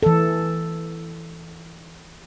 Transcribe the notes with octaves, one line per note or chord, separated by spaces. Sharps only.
E3 A4